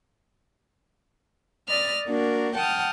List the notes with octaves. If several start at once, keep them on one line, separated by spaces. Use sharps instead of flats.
D5 D#5 B5 F6 A6
A#3 D4 F#4 A#4
F#5 G5 A5 D#6 F6